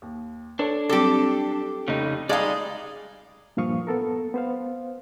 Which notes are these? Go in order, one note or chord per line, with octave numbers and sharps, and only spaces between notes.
D#2
D4 A4 C#5
F#3 G3 C4 G4 A4 D6
F1 C#3 D#4
G3 G#3 D#4 D5 F5 D#6
G2 A#2 F3 F5 C#6 D#6
B3 A4 A#4
B3 C5 F5